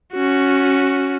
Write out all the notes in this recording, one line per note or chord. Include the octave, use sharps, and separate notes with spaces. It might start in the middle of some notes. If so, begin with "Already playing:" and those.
C#4 F#4